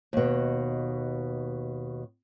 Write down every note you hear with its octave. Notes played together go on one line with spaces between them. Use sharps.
D#2 B2